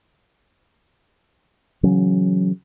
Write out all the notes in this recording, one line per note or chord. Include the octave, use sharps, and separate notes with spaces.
C#3 E3 F#3 C#4